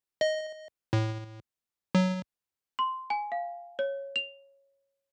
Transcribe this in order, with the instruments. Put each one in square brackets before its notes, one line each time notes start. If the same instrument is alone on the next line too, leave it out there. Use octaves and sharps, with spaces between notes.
[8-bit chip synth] D#5
A2
F#3
[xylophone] C6
G#5
F5
C#5
F7